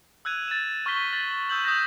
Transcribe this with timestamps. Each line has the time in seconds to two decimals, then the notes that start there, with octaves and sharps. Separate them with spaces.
0.25 E6 F#6 G#6 D#7 F7
0.48 A6 E7
0.86 C#6 F6 G6 G#6 B6 G7
1.13 A6 F#7
1.49 D#6 E6 G6 F#7
1.64 D#6 G6 A#6 E7